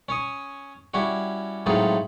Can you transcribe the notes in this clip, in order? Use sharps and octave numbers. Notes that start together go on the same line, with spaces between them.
C#4 C#5 D#6
G3 C#4 E4 F#4
A2 F#3 G#3 C4 D#4 F4